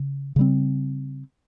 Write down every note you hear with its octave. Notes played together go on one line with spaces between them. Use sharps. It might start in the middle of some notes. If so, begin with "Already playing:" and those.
Already playing: C#3
C#3 G3 C4